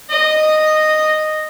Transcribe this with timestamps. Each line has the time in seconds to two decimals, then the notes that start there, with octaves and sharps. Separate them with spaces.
0.10 D#5